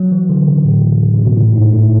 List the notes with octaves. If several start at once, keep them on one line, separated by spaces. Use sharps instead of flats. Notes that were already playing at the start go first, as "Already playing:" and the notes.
Already playing: F#3
E3
D3
C#3
A2
C#3
B2
A2
G#2
A2